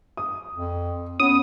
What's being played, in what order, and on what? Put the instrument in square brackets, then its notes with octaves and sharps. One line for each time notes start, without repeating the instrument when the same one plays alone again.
[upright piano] D#6
[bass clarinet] F2
[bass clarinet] B3 [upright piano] C#4 [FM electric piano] D#6